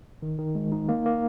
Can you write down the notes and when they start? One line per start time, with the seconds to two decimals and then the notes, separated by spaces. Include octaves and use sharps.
0.22 D#3
0.39 D#3
0.55 G#3
0.72 D#4
0.89 A#3
1.06 A#3